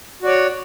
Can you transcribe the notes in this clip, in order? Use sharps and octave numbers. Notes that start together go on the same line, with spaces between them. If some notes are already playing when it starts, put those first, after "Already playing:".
F#4 C#5 D5